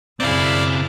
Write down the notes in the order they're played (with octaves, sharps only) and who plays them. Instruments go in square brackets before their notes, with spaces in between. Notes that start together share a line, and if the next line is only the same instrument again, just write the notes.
[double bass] F#2 [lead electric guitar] C#3 C4 [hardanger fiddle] E4 G#4 [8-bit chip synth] D5 F5